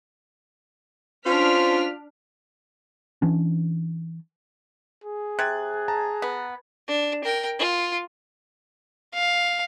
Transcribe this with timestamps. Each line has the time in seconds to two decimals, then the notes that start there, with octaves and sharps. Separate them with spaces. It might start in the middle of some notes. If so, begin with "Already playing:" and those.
1.26 C#4 D4 F4 C5 F6 B6
3.22 E3 C#4 D4
5.04 G#4
5.39 C3 F#6 G#6 A6
5.88 A5 A#5
6.22 B3
6.88 D4
7.24 A#4 G5
7.59 F4
9.14 F5